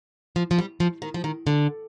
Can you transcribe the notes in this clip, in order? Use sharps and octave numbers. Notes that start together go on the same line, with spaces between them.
F3
F3
G3
F3
D#3
F3
D#3
D3